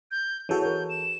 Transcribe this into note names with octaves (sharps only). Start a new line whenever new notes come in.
G6
E3 F#4 G#4 A4 C#5 G6
A#4 C#5 G6
E7